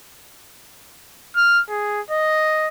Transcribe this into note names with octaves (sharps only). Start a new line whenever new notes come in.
F6
G#4
D#5